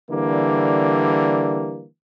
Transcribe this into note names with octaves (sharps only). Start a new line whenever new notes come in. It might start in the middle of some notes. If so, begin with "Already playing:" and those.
D3 E3 G3 A#3